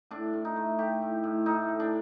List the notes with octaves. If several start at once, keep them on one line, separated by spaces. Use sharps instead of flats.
A2 D4
A2
D#4
A3
A3 G4
A2
A2
A2 D#4
A2
D4